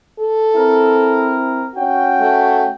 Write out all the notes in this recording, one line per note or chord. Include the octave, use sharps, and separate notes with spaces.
A4
C4 E4 A#4
C#4 F#4 G5
A3